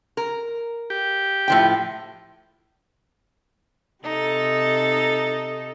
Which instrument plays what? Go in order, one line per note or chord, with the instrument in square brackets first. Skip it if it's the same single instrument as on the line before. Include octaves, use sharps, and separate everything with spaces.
[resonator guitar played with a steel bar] A#4
[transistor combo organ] G4
[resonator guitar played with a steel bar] A2 F3 G5
[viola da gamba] C3 A4 [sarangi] D#4